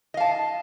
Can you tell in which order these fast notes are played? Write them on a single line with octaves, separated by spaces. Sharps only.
D#5 F5 A5